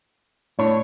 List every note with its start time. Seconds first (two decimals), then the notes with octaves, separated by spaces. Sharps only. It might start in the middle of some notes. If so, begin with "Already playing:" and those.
0.59 A2 D4 C#5